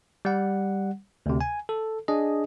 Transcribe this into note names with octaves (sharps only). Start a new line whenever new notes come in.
G3 F#5
D2 C3
G#5
A4
D4 G#4 D#5